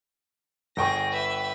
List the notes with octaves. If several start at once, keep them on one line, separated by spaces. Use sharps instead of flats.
G1 G#4 G5 C#6 A#6
B4 E5